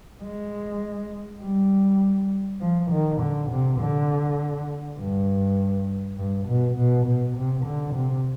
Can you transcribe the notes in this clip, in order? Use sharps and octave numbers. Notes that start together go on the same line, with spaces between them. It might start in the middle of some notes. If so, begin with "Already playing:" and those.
G#3
G3
F3
D#3
D3
C3
D3
G2
G2
B2
B2
B2
C3
D3
C3